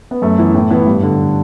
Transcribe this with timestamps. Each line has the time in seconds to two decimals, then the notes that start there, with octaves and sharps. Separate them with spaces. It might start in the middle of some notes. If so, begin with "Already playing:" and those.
0.11 B3
0.22 F#2 A3
0.39 E3 B3
0.54 A2 A3
0.71 E3 B3
0.87 G2
1.03 D3